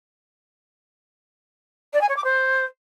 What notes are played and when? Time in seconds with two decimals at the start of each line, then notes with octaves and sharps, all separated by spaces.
1.93 D5
2.01 G#5
2.09 C#5
2.16 D6
2.24 C5